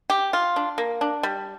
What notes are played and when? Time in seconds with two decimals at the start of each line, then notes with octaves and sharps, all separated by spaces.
0.10 G4
0.33 F4
0.56 D4
0.78 A#3
1.01 D4
1.23 G3